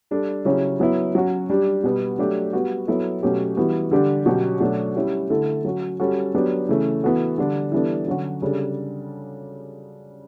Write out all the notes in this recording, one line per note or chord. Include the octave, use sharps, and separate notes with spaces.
G3 D4 A4
C#3 F#3 C#4 E4 G4
F#3 B3 E4
F#3 C#4 F#4
G3 D4 G4
B2 G3 B3
F#3 A3 D4 G4
G3 B3 F#4
F#3 B3 E4 A4
B2 F#3 A3 C#4 G4
E3 G3 B3 F#4
D3 G3 D4 G4
B2 F#3 C#4 G4
B2 F#3 A3 D4
G3 C#4 E4 G4
D3 A3 E4 A4
F#3 C#4 F#4
G3 C#4 F#4 A4
F#3 B3 D4 G4
C#3 E3 A3 C#4
E3 B3 F#4 A4
D3 G3 D4
E3 G3 B3 D4 A4
D3 F#3 C#4 F#4
C#3 G3 D4 A4